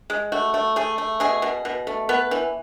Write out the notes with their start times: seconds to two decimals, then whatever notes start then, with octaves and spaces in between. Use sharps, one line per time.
0.10 G#3
0.32 A3 F#4
0.54 A3
0.76 A3 G#4
0.98 A3
1.20 B2 G#4
1.42 B2
1.65 B2
1.87 A3
2.09 B3 B4
2.31 E3